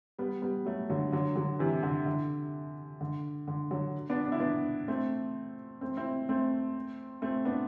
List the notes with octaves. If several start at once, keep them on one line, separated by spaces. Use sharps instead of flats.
G3 B3
G3 B3
F#3 A3
D3 F#3
D3 F#3
D3 F#3
C3 E3
D3
D3
D3
D3
D3 F#3
B3 D4
D4
E4
B3 D4
A3 C4
A3 C4
C4 E4
A3 C4
A3 C4
B3 D4